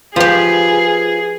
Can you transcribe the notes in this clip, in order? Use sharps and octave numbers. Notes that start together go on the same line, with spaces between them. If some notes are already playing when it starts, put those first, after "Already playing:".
F3 F4 G4 G#4 B4 C5